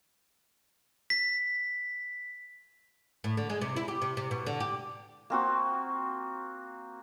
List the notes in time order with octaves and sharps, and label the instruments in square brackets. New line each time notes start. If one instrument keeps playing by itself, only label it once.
[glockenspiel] B6
[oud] A2
D3
G#3
C3
E4
G4
C3
C3
B2
D3
G4
[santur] A#3 C4 F#4